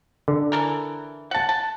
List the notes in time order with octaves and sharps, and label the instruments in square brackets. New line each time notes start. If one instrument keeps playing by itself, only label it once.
[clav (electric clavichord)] D3
[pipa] E3 A4 A#4
F#5 A5
A5